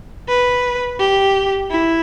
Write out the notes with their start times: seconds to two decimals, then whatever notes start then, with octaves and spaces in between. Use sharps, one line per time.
0.28 B4
0.99 G4
1.71 E4